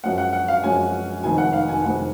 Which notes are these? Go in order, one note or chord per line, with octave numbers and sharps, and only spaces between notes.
F#2 F3 G#3 C#4 F#5
F#5
F#5
F5
F#2 F3 G#3 C#4 G#5
F1 F2 D#3 G#3 G#5
F#5
F5
G#5
F1 F2 D#3 G#3 F#5